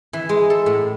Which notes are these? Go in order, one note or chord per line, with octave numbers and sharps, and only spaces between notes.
E3
G#3
A4
A2